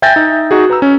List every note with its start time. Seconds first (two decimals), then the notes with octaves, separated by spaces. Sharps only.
0.02 E5 G5 G#5 G6 A6 A#6
0.16 D#4 E5
0.51 D#4 F#4 G#4
0.70 B4 A#5 E6
0.82 C#4